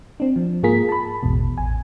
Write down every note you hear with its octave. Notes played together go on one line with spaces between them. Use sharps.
C4 D4
F3
G#2 A#3 F4 G#4 A#4 B6
A5 B5
A1 E2 G#2 B2
A1 G#5